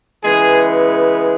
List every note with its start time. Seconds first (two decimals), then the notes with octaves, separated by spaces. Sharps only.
0.23 C#3 E3 G#3 B3 G#4